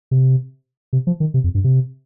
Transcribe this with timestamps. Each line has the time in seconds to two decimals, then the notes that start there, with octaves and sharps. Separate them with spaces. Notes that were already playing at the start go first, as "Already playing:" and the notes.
0.11 C3
0.93 C3
1.07 F3
1.20 D#3
1.34 C3
1.44 F2
1.55 G2
1.64 C3